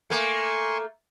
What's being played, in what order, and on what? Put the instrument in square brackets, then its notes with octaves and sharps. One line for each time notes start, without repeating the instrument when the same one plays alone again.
[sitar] A3 A#3 [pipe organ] G#5 C6 C#6